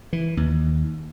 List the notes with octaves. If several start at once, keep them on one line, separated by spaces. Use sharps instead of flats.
E3
D#2